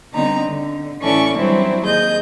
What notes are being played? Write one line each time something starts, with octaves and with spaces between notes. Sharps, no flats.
D3 G3 B3 C4 D#4 A#5
D3
A2 E3 C#4 A4 D5 C#6
E3 F#3 G3 C4 D4 E4
D#2 G#4 D#5 G6